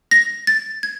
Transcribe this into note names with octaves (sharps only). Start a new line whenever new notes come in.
A#6
A6
G#6